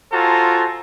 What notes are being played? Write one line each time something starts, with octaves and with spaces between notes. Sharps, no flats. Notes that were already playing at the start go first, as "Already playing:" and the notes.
F4 F#4 A4 C5 G#5 A#5